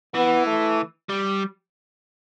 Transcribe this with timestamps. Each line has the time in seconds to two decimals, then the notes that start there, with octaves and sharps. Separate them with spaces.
0.14 E3 B3
0.47 A3
1.09 G3